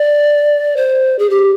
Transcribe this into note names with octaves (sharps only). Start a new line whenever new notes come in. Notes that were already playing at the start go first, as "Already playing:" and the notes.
Already playing: D5
C5
G#4
G4